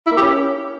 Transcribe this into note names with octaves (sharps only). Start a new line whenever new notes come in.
E4
A#3
G4
C#4